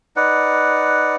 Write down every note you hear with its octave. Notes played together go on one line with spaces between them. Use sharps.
D#4 B4 D5 F#5